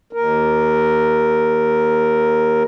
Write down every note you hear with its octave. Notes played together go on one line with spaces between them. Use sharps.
D#2 A#4